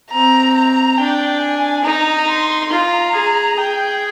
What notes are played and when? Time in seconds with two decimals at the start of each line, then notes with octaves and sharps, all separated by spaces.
0.11 C4 A#5
0.55 A#5
0.98 D4 G5
1.42 G#5
1.84 D#4 A#5
2.28 C6
2.71 F4 A#5
3.15 G#4
3.58 G#4 G5